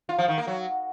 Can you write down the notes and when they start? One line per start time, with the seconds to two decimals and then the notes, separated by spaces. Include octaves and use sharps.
0.09 F4
0.18 F3
0.28 D#3
0.38 A#3
0.47 F#3